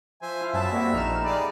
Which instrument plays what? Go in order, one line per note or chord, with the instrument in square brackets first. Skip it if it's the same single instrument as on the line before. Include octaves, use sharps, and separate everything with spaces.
[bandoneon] F3 C5 [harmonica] E5 G#5
[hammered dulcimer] E4 [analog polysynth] F5
[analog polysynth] F#2 F#3 A5 [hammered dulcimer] B3 G#5 B5 [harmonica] E5
[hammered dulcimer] G3 [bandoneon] A3 C4 F#4 [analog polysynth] A#3
[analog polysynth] A#1 F6 E7 [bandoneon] A3 D#4
[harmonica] B3 G#4 [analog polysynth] D5